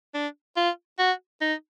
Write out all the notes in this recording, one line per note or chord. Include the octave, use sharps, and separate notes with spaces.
D4
F4
F#4
D#4